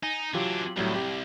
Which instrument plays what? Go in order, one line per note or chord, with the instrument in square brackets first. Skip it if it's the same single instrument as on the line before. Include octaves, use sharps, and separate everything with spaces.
[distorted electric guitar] D#4 [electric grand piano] G#5
[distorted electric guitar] E3 D4 [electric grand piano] F#3 F4 G4
[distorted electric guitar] C2 [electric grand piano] A2 F#3 G3
[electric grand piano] G4